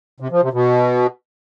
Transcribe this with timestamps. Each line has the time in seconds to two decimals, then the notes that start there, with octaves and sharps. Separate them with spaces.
0.20 C3
0.31 F3
0.42 C3
0.53 B2